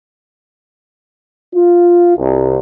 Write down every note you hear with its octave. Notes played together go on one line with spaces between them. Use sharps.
F4
C2